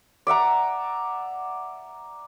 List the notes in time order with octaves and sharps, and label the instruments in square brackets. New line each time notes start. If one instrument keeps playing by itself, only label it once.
[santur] D5 E5 F#5 A#5